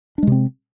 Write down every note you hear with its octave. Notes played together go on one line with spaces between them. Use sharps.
C3 G#3 C4 D4